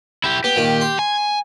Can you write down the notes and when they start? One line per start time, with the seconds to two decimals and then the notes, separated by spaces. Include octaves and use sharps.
0.24 E4 G4
0.44 B3 G4
0.56 A#2 D#3
0.81 C6
0.99 G#5